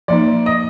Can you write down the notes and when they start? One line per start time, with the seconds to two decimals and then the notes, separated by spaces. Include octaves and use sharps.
0.08 F3 A#3 D#4 D5
0.46 D#5